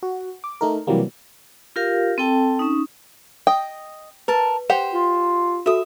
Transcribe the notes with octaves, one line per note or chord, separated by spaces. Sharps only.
F#4
D6
A3 D#4 A#4
C3 E3 F#3 G3 A#3
F4 G4 A#4 F5
C4 A4 G5 A5
C#4 D#4
D#5 G5
A#4 B4 A5
G4 C5 F#5
F4
F#4 A4 E5 D#6